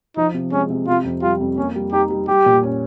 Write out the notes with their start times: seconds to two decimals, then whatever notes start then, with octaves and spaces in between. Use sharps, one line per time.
0.17 F3 D#4
0.34 C3
0.52 G#3 C#4
0.70 C3
0.87 C3 F4
1.04 F2
1.22 G3 F4
1.40 F2
1.57 A#3 C#4
1.75 G3
1.92 D#4 G4
2.10 G3
2.28 G3 G4
2.46 A#2
2.63 C#4